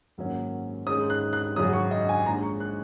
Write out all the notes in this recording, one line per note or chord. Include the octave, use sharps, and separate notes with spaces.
G#1 F#2 F#3 A#3 C#4
G#2 D#3 G#3 C#4 D#6
F#6
F#6
G#1 F#2 C#3 F#3 C#4 D#6
C#6
D#5
G#5
A#1 G#2 D#3 G#3 A#5
C#6
F#6